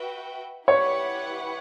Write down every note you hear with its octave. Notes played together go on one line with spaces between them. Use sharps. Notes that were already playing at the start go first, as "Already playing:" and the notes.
Already playing: F#4 B4 E5 G5
E4 G4 B4 C#5 F#5